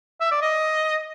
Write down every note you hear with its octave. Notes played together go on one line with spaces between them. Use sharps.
E5
D5
D#5